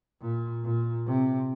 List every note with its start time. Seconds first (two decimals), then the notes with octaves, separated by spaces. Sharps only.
0.21 A#2
0.64 A#2
1.06 C3